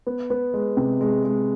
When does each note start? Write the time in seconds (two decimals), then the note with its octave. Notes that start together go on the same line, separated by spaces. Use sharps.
0.07 B3
0.30 B3
0.54 G#3
0.77 C3
1.01 G#3
1.24 G#3